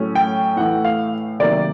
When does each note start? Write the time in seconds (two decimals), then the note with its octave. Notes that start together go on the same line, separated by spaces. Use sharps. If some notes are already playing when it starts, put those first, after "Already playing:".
Already playing: A2 F#3 A3 C#4
0.15 G5
0.56 A2 E3 A3 F#5
0.85 F5
1.39 C3 D#3 F#3 A#3 D5